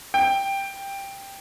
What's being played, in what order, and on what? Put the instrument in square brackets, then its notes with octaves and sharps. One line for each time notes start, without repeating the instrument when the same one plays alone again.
[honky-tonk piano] G5